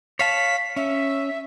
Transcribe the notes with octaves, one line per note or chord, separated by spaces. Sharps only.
C#5 F5 A5 B6
C#4 E5